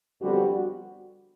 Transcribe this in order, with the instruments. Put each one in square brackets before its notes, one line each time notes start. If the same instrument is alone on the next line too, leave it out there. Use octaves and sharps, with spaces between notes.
[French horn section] F2 D3 G3 B3 F#4